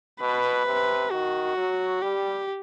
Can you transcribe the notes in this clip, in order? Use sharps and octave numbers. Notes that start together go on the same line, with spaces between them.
B2 B4
C3
D#3 F#4
F#3
G3 G4